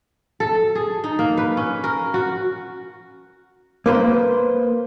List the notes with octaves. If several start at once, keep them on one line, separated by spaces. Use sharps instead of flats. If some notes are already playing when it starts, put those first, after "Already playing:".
A4
G#4
D#4
A#3
B4
C#4
A#4
F#4
A#3 B4 C5